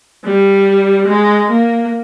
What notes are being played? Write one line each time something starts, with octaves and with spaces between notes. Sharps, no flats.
G3
G#3
A#3